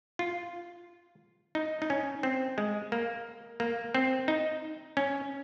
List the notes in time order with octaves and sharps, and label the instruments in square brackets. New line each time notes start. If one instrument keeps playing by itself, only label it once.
[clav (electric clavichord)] F4
D#4
D#4
C#4
C4
G#3
A#3
A#3
C4
D#4
C#4